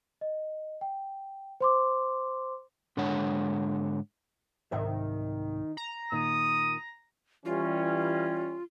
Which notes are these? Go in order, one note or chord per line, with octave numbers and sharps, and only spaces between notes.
D#5
G5
C5 C6 D6
G#2 D3 G#3 D4 C#5 F#5
C2 G#2 D#3 E5
A#5
A#2 D#3 D#6
E3 G3 C#4 F4